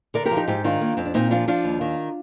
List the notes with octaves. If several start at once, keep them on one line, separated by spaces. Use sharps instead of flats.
D3 A#4 D5
G4 A#4
F3
D#4 G4
G#2 D#4 G4
D#3 D4 F4
A#3
F2 C4
D4
A#2 C4 D#4
F3 D4 F4
F3 D4 F4
D#2
D#3